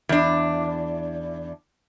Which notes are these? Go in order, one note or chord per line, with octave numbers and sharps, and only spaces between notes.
E2 D4